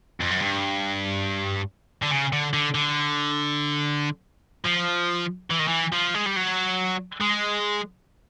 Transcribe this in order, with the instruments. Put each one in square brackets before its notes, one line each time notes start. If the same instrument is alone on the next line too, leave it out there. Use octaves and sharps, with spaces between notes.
[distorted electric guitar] F2
F#2
G2
D3
C#3
D3
D3
D3
F3
E3
D#3
E3
F3
G#3
G3
F#3
G#3